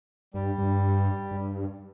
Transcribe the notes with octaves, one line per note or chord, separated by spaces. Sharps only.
G2 G3
G2
G2